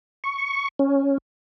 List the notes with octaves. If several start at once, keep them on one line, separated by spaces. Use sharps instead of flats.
C#6
C#4